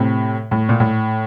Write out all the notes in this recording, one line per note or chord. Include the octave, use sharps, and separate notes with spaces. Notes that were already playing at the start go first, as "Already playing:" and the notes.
Already playing: A2 C3
A2
A#2
A2